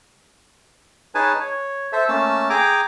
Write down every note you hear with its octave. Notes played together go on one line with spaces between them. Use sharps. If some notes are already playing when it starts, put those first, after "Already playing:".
D#4 G#4 B4 C#5 G#5 A5
C#5
A4 C5 E5
A3 A#3 C#4 A5 E6
G#4 G5 G#5 A#5 D6